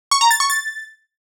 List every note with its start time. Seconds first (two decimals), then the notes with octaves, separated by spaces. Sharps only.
0.11 C#6
0.21 A#5
0.31 A6
0.40 C#6
0.50 A6